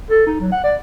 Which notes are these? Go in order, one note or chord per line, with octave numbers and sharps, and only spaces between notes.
A4
D#4
F#3
F#5
D5